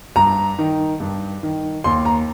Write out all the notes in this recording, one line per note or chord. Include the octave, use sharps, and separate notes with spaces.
G2 A#5
D#3
G2
D#3
D#2 C6
A#5